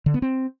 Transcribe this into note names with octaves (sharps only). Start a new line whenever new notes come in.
D3
B3
C4